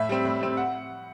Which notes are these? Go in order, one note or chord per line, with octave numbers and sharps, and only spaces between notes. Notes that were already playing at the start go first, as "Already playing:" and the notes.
Already playing: A2 E5
G3 C4
A2
G3 C4
F#5